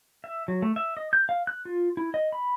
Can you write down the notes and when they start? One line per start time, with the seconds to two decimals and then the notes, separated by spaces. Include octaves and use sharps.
0.24 E5
0.48 F#3
0.62 A3
0.76 E5
0.97 D#5
1.13 G6
1.29 F5
1.47 F#6
1.65 F4
1.97 E4
2.14 D#5
2.32 B5